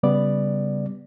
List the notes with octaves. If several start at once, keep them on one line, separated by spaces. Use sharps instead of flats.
C#3 G3 B3 D5